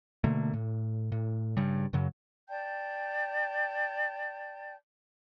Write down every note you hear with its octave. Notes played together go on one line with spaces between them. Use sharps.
B2 D3 A3 A#3
A2
A2
G2 C#3 G3
F#2 C#3 F#3
D5 G5 A5 G6